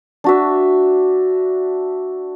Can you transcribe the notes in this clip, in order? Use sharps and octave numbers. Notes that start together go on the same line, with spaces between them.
D4 F#4 E5